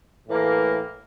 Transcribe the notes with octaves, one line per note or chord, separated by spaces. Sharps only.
A2 E3 A#3